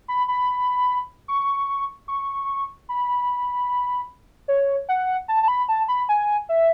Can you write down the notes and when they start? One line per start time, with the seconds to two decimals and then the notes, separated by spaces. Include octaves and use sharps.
0.08 B5
0.28 B5
1.28 C#6
2.08 C#6
2.89 B5
4.48 C#5
4.89 F#5
5.28 A5
5.43 A5
5.48 B5
5.69 A5
5.88 B5
6.09 G#5
6.49 E5